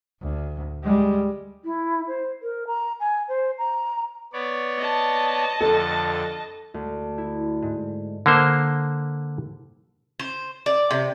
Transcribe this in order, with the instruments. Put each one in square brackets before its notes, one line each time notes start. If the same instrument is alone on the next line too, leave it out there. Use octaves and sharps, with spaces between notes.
[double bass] D2
G3 G#3
[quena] E4
C5
A#4
A#5
G#5
C5
A#5
[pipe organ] B3 C#5 D5
[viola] D#5 A5
[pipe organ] F2 D3 A6 [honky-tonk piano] A4
[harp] D2
E4
G#2
[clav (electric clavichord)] D3 A#3 C5
[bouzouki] C5
D5
C3